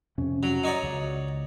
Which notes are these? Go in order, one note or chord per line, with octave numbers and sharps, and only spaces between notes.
F2 C3 C#4
F#3
D#4 C#5 D5
C#2